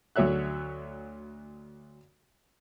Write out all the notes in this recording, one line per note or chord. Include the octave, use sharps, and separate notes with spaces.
D2 F#3 C#5 E5 F#6